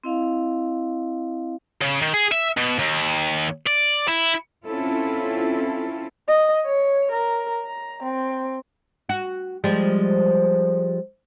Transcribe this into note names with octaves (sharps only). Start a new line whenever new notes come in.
C4 E4 D#5 F5
C#3
D#3
G#4
E5
B2
D#2
D5
E4
C4 C#4 E4 F4 A4
D#5
C#5
A#4
A#5
C4
F#4
F3 G3 G#3